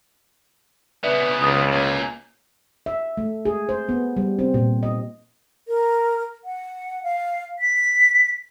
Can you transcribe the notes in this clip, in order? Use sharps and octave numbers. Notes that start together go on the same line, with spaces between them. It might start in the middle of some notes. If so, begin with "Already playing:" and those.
C#3 B3 B4 D5 E5
C#2 D#6 A6
A#3 C#5 G#5
E5
A3
G#4
C5
B3
G3
C4
A#2
D#5
A#4
F#5
F5
B6